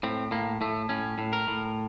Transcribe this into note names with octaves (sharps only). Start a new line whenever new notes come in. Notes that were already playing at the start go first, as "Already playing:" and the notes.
A2 C4
A2 A#3
A2 A3
A2 C#4
A2
A#4
A2